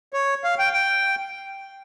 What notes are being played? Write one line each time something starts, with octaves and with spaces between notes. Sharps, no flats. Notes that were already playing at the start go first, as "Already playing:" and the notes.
C#5
F5
G5
G5